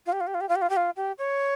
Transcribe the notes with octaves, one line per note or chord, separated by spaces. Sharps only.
F4
G4
F4
G4
F4
G4
F4
G4
F4
G4
F4
G4
C#5